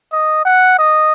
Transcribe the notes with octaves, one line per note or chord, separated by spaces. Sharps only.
D#5
F#5
D#5